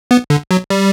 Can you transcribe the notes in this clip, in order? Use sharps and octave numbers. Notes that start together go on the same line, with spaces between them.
B3
D3
F#3
G3